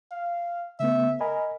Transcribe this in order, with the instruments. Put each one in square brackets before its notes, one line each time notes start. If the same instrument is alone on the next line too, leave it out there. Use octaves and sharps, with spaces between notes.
[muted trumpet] F5
[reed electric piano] C#3 A3 B3 [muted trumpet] E5
[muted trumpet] A#4 [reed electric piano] D#5 G#5 B5